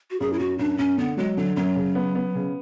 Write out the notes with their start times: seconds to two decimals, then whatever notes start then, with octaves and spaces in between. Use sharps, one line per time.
0.11 F#4
0.20 F#2 G#4
0.33 E4
0.39 F#2 F#4
0.58 F#2 D4
0.78 F#2 C#4
0.98 D3 B3
1.18 F#3 G#3
1.37 D3 F#3
1.56 F#2 F#3
1.76 C#3
1.95 B3
2.15 B3
2.35 C#3